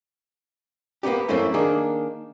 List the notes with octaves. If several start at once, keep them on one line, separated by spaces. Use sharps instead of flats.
A#3 B3 C#4 D#4 G4
F#2 A3 A#3 C4 C#4 E4
D#3 A#3 D4 G#4